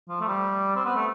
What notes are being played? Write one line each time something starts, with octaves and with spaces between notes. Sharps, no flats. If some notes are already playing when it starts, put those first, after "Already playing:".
F3
A3
G3
C4
B3
A3